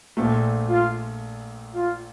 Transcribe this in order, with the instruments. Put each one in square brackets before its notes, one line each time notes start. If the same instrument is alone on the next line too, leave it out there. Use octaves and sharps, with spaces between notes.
[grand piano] A#1 A#2 A3
[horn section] F4
F4